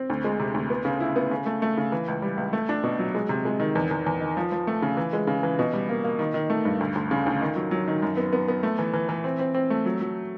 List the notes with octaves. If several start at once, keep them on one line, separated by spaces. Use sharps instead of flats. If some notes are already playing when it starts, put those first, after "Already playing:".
Already playing: C4
D2
G#3
C3
D2
B3
C#3
E4
B3
C#3
A3
A3
C#3
E3
C#2
G3
C#2
A3
D4
B2
F#3
G#3
C3
G#3
D#3
E2
E2
E2
D#3
F3
F3
A3
C#3
E3
G#3
C#3
E3
B2
G3
A#3
A#3
D#3
D#3
A3
G2
D2
D2
C#3
D2
D#3
F#3
F#3
D#3
F#2
B3
B3
B3
A3
E3
E3
E3
C4
C4
C4
A3
F#3
F#3